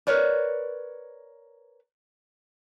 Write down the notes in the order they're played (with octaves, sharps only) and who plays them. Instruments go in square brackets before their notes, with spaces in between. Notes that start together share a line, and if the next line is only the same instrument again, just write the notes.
[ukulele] A#4 B4 C#5 D5